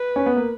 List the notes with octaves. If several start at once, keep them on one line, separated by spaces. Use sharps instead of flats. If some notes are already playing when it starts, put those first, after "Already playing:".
Already playing: B4
C#4
B3
A#3